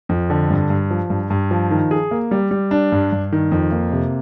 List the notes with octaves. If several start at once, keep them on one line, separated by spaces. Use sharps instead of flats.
F2
D3
G2
G2
F3
G2
G2
F3
D#3
G#4
A#3
G3
G3
D4
G2
G2
D#3
F2
A#3
C3